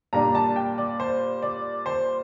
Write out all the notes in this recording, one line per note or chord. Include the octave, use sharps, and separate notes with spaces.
A#2 G3 D4 A#5
A5
G5
D5
C5
D5
C5